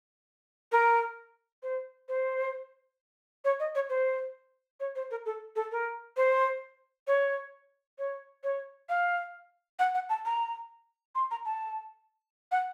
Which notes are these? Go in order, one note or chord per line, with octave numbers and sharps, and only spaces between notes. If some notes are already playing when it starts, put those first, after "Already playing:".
A#4
C5
C5
C#5
D#5
C#5
C5
C#5
C5
A#4
A4
A4
A#4
C5
C#5
C#5
C#5
F5
F#5
F#5
A5
A#5
C6
A#5
A5
F#5